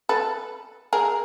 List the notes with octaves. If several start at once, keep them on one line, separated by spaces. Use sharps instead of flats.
A4 B4
G#4 A#4